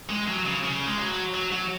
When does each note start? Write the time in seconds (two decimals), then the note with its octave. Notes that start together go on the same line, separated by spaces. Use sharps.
0.09 G#3
0.27 F#3
0.45 C#3
0.63 C#3
0.87 G#3
0.99 F#3
1.34 F#3
1.52 F#3